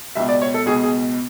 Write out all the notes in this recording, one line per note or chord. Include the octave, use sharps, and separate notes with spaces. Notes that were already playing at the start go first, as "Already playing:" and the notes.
C#2 B2 E5
D5
C#5
A4
C#2 B2 G#4
G#4